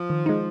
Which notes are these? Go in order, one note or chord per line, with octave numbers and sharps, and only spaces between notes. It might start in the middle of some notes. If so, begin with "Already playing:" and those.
Already playing: F3
D#3
G#3 D#4